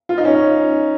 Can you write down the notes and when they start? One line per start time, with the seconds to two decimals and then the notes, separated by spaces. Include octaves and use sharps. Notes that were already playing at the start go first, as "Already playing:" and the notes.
0.09 F4
0.18 D#4
0.25 C#4